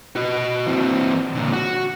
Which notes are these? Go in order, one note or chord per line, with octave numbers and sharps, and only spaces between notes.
F#4 D#5
E3 C4
A#2 D3
F#4